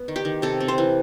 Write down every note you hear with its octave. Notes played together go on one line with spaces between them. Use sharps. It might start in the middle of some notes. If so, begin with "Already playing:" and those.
Already playing: B3
D#3
G4
D#3
C3 A4
C4
C5
E3